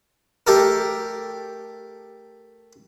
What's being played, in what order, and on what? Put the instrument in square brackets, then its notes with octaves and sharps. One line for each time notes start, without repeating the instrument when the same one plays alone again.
[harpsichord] A3 G4 A4 A#4